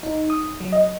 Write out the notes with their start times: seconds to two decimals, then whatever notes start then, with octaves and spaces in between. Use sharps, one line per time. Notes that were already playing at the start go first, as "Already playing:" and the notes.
0.03 D#4
0.30 D#6
0.60 F#3
0.72 D#5